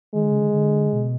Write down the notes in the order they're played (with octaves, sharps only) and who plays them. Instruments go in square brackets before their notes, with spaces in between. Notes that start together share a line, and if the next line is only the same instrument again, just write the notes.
[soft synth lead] D#3 [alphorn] G#3
[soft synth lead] D3
C#3
D3
D3
B2